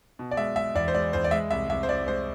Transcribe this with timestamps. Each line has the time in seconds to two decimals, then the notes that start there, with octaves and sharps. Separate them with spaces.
0.19 B2
0.31 D5
0.37 G#3 E5
0.56 G#3 E5
0.75 E2 D5
0.88 C5
0.94 G#3 D5
1.13 E2 C5
1.24 D5
1.31 G#3 E5
1.51 C2 E5
1.69 C2 E5
1.83 C5
1.89 C2 D5
2.07 G#3 C5